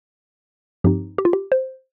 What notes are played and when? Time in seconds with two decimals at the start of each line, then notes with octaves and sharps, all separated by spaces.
0.84 G2 F3 C4 D#4 G4
1.18 G4
1.25 F4
1.33 G4
1.52 C5